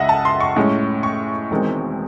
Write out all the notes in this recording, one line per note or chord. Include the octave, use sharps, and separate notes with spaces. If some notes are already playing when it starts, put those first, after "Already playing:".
Already playing: C#2 C#3 D#5 E5 F#5
A5
C6
C#6
A2 G#3 C#4
C#6
E1 E2 D#3 G#3 C4